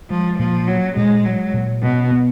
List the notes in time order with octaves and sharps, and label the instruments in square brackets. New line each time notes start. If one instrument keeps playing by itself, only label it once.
[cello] F3 [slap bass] G#3
[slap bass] A#2 [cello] F3
[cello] F#3 [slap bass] C#4
[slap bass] A#2 [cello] G#3
[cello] F#3 [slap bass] G#3
[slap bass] A#2
[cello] B2 [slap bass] C#4
[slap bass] B3